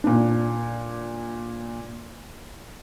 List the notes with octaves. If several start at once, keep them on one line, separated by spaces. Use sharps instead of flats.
A#2 D4